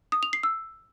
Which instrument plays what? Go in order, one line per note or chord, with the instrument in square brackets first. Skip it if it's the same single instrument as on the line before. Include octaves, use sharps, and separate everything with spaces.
[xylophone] D#6
F7
C7
E6